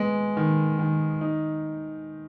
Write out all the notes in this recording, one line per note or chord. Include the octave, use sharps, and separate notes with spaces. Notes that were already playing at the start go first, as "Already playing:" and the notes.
Already playing: G#3 B3
D#3
D#3
D#4